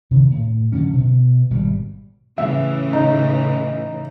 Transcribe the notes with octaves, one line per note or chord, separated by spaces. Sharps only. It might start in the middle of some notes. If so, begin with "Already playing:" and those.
C3 D#3 E3
A2
D3 F3 F#3 C#4
B2
G#1 B2 G3
A2 C#3 E3 E5
D#4